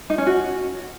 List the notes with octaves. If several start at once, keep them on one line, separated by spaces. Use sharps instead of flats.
D#4
C#4
F#4